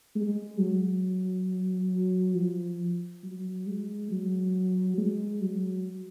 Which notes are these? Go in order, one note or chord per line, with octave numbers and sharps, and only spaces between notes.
G#3
F#3
F3
F#3
G#3
F#3
G#3
F#3